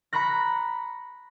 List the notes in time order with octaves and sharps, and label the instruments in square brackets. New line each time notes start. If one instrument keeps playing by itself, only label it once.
[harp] A#5 B5 C#6 F#6 A#6